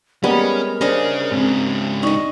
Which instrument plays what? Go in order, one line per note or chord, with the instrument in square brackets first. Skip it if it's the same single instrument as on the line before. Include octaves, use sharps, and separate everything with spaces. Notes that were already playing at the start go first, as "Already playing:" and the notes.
[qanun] G3 G#3 B3 [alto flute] A#3 [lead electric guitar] C#4
[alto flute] A#4
[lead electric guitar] C#4 G#4 [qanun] D4 C5 D#5
[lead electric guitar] G#2 C#3 [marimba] C4
[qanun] D4 D#5 [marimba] D#4 [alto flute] C#6